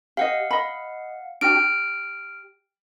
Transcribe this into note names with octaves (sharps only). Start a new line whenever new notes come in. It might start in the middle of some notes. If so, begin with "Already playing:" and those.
G4 D#5 F5 F#5
D#5 B5
D4 F#4 G5 F6 D7
G4